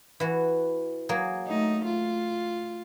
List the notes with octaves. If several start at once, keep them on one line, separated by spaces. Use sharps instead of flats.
E3 F#4
F#3 A#3 G#4
A3 D#4
F4